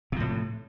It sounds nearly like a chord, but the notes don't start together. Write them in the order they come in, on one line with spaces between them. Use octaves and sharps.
C3 F3 A2